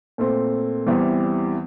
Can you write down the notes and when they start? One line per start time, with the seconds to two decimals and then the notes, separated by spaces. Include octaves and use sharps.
0.18 A#2 A3 C4
0.86 E2 E3 G3 C4